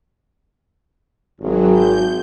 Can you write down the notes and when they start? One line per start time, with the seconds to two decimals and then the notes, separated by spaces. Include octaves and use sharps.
1.41 G#1 F#3
1.71 G6